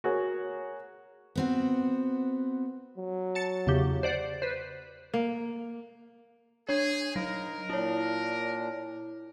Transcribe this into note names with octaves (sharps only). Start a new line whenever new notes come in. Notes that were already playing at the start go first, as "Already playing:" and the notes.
F#4 G#4 A#4 C#5
B3 C4 F#4
F#3
A5 A6 C#7
E2 C#3 G4
C5 D5 F#5
B4 C5
A#3
D4 G#4 C#5
F#3 D#4 A#4
A#2 D4 E4 C#5